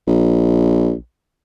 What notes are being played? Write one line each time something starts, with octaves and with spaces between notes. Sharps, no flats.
A#1